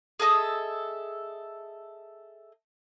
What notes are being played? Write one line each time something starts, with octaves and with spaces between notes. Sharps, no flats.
G#4 A4 D#5 E5